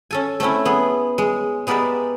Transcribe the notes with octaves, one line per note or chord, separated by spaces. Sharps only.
C#4 A4 G#5
A3 C4 C#4 E4
B3 G#4
G#3
G#3 B3 G4 A#4 D5 E5